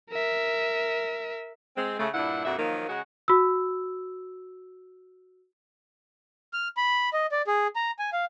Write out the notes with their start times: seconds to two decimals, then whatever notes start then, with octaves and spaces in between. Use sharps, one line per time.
0.10 A#4 E5
1.77 G#3 C4
2.00 C#3 A3
2.14 G2 A#2 D4 E4 F#5
2.45 F2 A#2 D4 F#4 E5
2.59 D#3 F3 F#3 A#3
2.89 C#3 G#3 F#4
3.28 F#4 E6
6.53 F6
6.77 B5
7.13 D#5
7.32 D5
7.47 G#4
7.76 A#5
7.99 G#5
8.13 F5